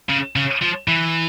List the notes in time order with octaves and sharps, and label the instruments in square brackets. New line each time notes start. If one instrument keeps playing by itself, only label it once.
[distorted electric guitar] C#3
C#3
F3
E3